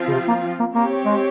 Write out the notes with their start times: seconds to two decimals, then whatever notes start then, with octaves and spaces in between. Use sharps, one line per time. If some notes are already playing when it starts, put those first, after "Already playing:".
Already playing: F3 C4 F4
0.08 C#3
0.13 C3
0.28 A#3
0.60 A#3
0.74 A#3 C4 G4 C#5
1.05 G#3